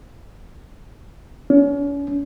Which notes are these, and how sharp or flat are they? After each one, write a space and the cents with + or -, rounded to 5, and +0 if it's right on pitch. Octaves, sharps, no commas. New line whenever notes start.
C#4 +40